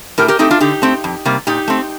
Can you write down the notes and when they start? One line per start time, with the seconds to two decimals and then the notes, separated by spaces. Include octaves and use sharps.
0.18 A2 G4 A#4
0.28 G4 A#4
0.39 A3 C4 D#4 G4
0.51 D4 F4
0.60 D3 D#4 G4
0.82 A3 C4
1.04 F2
1.25 C3 G3 A#3
1.47 A#2 D#4 G4
1.68 A3 C4